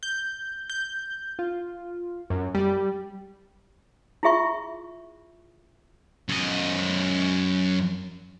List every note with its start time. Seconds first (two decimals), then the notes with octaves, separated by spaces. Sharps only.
0.03 G6
0.70 G6
1.39 F4
2.30 F#2
2.55 G3
4.23 E4 F4 G#4 E5 C#6
6.29 F#2 D#5